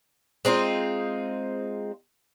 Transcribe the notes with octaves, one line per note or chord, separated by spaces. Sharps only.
G#3 C4 D#4 F4